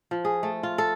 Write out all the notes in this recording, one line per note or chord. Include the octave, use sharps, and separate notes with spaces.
F3
G#4
A3
F4
A4